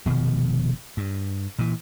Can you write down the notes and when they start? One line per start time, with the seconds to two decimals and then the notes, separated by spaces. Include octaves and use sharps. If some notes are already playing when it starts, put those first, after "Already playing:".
0.06 F1 B2 D#3 F3
0.97 G2
1.59 A#2 E3